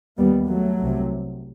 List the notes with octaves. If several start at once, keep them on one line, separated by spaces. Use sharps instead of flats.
D#2 G3 B3
F#3 A3
C2 C3